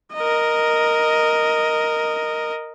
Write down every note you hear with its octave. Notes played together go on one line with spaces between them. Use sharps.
A#4 D#5